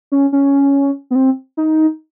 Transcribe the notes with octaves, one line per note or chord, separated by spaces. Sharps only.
C#4
C#4
B3
C4
D#4